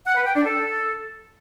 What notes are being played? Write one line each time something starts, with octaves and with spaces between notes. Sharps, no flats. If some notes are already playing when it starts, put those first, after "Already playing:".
F#5
B4
G5
D4
A4